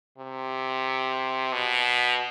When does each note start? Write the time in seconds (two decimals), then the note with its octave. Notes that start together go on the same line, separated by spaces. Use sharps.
0.18 C3
1.53 B2